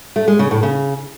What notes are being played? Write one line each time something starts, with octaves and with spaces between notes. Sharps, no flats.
A3
G#3
C#3
A2
C#3